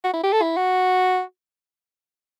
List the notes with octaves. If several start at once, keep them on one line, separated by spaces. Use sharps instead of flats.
F#4
E4
G4
A4
E4
F#4